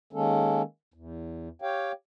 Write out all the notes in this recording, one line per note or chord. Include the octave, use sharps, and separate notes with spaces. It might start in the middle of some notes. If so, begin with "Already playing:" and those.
D#3 G#3 A#3 C#4 A4
E2
G4 C#5 F5 G5